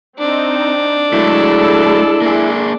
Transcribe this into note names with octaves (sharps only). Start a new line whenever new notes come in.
C4 D4 D#4
F#3 G#3 A3 E4 A4
A#3 G#4